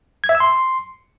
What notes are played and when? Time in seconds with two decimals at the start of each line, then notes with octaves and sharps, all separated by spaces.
0.24 G#6
0.29 E5
0.35 E6
0.40 C6